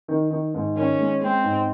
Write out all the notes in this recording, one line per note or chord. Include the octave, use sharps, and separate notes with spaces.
D#3
D#3
G#2
D#3 C#4
G#3
G#3 C4
G#2